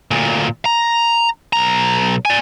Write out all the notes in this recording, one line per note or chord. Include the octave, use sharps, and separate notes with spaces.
D2 A#2
A#5
B1 A#5
D5 G#5